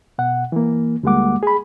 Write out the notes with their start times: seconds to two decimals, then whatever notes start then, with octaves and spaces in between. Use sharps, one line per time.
0.18 B2 F#5
0.52 E3 A#3
1.03 D2 G3 G#3 A#3 F#5 D6
1.43 G#4 B5